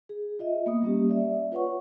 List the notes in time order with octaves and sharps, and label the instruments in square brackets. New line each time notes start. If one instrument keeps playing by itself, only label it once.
[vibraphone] G#4
F4 D#5 E5
A#3 B3 D#6
G3 A#3 C#4 G4
D5 E5
F4 B4 C#5 F#5 C#6